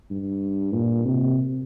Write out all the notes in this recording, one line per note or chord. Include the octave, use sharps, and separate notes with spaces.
G2
A#2
C3